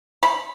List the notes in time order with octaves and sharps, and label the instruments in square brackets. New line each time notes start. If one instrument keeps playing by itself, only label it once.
[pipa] B5